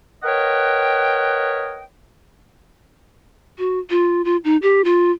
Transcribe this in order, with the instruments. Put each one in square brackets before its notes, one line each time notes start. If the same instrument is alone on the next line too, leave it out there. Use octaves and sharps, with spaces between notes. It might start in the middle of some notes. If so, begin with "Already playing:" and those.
[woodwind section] A#4 B4 C#5 D#5 F#5 G5
[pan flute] F#4
F4
F4
D#4
G4
F4